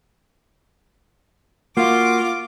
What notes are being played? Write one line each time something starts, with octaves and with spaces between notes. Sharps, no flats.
A#3 F4 F#4 D6